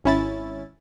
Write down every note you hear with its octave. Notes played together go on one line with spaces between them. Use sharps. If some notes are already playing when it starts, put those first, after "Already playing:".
G#1 C#4 E4 A6